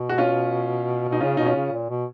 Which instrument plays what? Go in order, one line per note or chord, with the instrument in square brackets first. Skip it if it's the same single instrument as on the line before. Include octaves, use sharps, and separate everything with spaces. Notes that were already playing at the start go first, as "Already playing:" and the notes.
Already playing: [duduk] B2
[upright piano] F#4
C#4 F4
[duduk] B2 [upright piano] D#4
[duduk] C#3 [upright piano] C#4 F4
[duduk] B2 [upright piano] D#4
[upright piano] C#4 F4
[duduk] C#3
A#2
B2